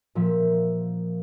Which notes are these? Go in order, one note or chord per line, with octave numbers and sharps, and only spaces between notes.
A#2 F3 E5